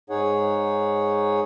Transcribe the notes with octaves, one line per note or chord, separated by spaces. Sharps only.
G#2 D#4 G#4 C#5 F#5